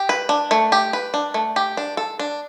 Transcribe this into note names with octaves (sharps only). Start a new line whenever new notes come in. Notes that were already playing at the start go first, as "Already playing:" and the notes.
Already playing: G4
B4
D4
A3
G4
B4
D4
A3
G4
D4
A4
D4